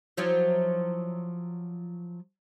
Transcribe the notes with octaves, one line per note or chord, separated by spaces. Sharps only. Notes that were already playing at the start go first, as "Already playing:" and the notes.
F3 F#3 E4